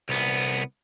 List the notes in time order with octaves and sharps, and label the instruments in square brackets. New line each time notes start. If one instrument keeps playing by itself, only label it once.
[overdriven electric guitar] C2 B3